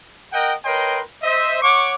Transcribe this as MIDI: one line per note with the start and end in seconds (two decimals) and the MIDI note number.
0.33 0.53 70
0.33 0.53 75
0.33 0.53 78
0.33 0.53 79
0.65 1.00 70
0.65 1.00 71
0.65 1.00 73
0.65 1.00 75
0.65 1.00 79
0.65 1.00 84
1.23 1.60 72
1.23 1.60 75
1.23 1.60 76
1.62 1.95 73
1.62 1.95 78
1.62 1.95 85
1.62 1.95 86